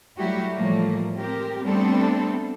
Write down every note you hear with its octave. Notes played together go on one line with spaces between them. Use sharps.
F#3 G3 A3 E4 F#4 G4
A2 E3 F3 G3 A3 A#3
G#3 C4 G4 A#4
G3 A3 B3 C4 D4 A4